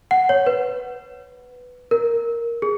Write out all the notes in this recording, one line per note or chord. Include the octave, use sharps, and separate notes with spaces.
F#5
C#5
B4
A#4
G#4